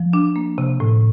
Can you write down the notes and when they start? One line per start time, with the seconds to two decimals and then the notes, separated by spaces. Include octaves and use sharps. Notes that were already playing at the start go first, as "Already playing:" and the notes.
Already playing: F3
0.13 D4
0.36 A#3
0.58 C3
0.80 A2